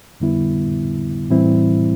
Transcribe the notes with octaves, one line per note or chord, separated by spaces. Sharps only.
F2 D3 G3 B3 E4
A2 E3 G3 C4 E4